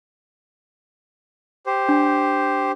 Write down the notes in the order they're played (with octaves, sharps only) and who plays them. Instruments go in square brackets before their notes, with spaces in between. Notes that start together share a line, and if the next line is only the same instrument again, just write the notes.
[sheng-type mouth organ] G4 C5
[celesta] D4